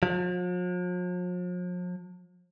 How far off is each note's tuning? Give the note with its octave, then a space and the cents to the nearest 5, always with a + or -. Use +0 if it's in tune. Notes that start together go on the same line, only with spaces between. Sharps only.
F3 +45